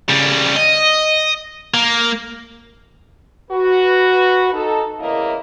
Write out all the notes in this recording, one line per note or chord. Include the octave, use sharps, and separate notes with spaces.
C#3 G3
D#5
A#3
F#4 B4
D#4 A4
E2 C#3 A#3 E4 A#4 D#5